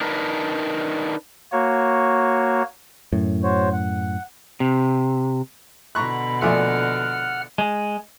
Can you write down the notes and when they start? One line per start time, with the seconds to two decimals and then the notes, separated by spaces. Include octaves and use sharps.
0.01 D4 D#4 A#4 B4
1.52 A#3 F#4 C#5
3.13 F#2 A2
3.43 F#4 C5 C#5
3.73 F#5
4.60 C3
5.95 B2 D3 A#5 B5 C#6 F#6
6.41 A#1 A3 D5 E5 F#5 G#5 C6 F6
7.58 G#3